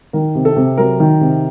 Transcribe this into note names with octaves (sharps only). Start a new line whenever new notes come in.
D#3 A#4
C3
A4
C3
F#3 A#4
D#3
C3